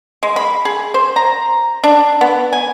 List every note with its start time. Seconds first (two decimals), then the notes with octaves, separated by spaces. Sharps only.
0.23 G#3
0.36 B5
0.65 G#4
0.94 C5
1.16 A#5
1.84 D4
2.21 B3
2.53 G#5